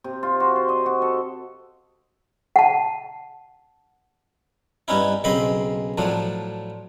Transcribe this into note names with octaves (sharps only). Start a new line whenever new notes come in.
C3
F4
F#4
C5
D#5
F#4
A4
F#5 A5
G2 B3 C#4 D#4 E4
B1 C#3 C4 D#5 B5 C6
A2 F3 F#3 D4